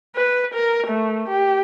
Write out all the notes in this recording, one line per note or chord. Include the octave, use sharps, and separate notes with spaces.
B4
A#4
A3
G4